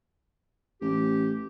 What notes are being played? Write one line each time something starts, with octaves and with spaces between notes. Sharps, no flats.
A1 G4